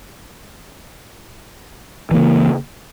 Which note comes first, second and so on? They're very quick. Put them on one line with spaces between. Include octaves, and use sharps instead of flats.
E3 A#3 C#3